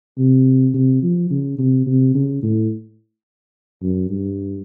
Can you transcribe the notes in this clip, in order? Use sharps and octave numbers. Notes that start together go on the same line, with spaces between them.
C3
C3
F3
C#3
C3
C3
C#3
A2
F#2
G2